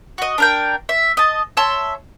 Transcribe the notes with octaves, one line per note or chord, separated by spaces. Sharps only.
F#4 D#5
D4 A#4 G5
E5
D#5 A5
C#5 E5 A5 C6